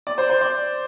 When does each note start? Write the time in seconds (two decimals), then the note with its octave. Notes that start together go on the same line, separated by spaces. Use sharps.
0.07 D5
0.18 C5
0.30 C5
0.41 D5